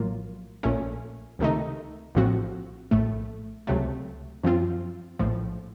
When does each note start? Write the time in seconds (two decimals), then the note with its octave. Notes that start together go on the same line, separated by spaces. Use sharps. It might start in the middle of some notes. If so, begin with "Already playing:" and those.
Already playing: A#1 A2 F#3 A#3 F4
0.63 A#1 A#2 A3 C#4
1.39 C#2 C3 D#3 A3 D#4
2.15 A#1 A2 F3 C4 F#4
2.91 A#1 A2 A3
3.67 C#2 C3 F#3 A3
4.44 F#2 F3 C4 F4
5.19 A#1 A2 F3